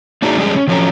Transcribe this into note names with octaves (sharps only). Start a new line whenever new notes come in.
A#3 D4 D#4 F#4 G#4
G3 G#3 C#4 D4 G4 G#4
C#4
D#3 F3 F#3 C#4 A4 A#5